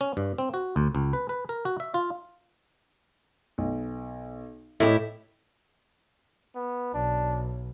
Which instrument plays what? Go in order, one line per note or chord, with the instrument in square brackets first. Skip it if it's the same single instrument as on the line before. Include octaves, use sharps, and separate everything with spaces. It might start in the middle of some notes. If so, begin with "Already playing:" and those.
[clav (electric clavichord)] C#4
G2
C4
F#4
D2
C#2
B4
B4
A#4
F#4
E5
F4
[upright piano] B1
[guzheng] A2 [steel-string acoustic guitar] E4 G4 [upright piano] D#5
[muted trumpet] B3
[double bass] B1 [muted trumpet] D4